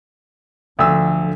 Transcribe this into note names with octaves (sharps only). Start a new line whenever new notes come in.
D2 D3 F3 E6